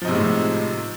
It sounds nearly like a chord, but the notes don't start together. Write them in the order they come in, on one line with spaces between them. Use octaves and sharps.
F3 D#4 C3 G#3 A2